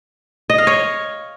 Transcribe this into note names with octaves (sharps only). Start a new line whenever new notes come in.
D#5
F5
C#5